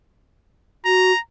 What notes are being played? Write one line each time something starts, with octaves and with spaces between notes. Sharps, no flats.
F#4 A#5